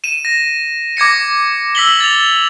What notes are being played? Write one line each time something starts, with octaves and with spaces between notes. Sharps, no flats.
D#7 E7
A#6
D6 G#6 A#6 C#7
E6 B6 F#7 G7
A6 F7